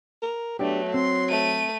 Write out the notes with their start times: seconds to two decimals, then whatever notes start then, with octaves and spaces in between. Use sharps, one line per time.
0.22 A#4
0.59 F#3 A3 B3 D4 G4
0.94 C4 C6
1.29 A3 D#7